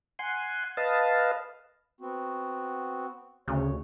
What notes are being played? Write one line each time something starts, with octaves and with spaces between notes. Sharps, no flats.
F#5 G#5 C6
B4 D#5 F5 A5
B3 C4 F#4
D2 C#3 C#5